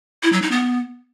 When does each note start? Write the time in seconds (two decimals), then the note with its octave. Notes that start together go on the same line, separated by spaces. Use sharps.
0.23 E4
0.32 F#3
0.42 D#4
0.51 B3